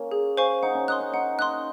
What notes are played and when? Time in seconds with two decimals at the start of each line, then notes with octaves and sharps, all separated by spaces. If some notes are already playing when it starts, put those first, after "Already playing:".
Already playing: A#3 C#4
0.11 G#4
0.37 C5 F5 G#5 C#6
0.63 D#4 F#5
0.75 C#4
0.88 D#4 C6 D#6 F#6
1.00 C#4
1.13 D#4 F#5
1.39 D#4 C6 D#6 F#6